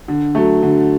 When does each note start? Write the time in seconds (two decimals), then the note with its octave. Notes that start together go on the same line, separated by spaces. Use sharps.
0.08 D3
0.35 F#3 A3
0.63 D3